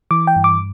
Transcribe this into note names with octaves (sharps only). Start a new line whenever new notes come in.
E3 D6
G5
G2
D6